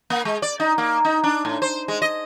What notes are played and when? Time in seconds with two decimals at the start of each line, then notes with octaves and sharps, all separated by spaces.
0.10 A#3
0.25 G#3
0.42 D5
0.60 D#4
0.78 A#3
1.05 D#4
1.24 D4
1.45 A2
1.62 C5
1.88 G#3
2.02 D#5